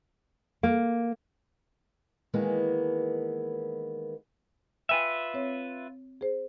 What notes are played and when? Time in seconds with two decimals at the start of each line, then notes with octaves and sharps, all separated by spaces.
0.63 A#3
2.33 D#3 E3 G#3 A#3 B3
4.89 F4 B4 E5 G5 G#5
5.34 C4 C#5
6.21 G#4 C5